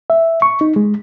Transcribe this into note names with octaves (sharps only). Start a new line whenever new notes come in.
E5
C#6
D#4
G#3